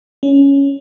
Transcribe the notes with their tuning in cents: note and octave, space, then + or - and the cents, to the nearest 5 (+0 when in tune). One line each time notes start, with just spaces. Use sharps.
C#4 +5